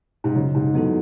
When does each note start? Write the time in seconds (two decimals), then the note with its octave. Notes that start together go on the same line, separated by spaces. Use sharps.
0.24 G#2
0.35 F#2 C#3
0.55 G#2
0.74 E2 F#3 B3 F#4 A4